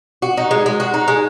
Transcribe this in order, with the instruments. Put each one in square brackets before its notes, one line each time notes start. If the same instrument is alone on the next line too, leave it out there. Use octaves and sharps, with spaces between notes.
[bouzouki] F#4
D#4
G#3
G#3
F#4
D#4
G#3